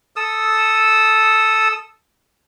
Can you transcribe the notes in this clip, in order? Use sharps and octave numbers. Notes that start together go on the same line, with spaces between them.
A4 D#6 E6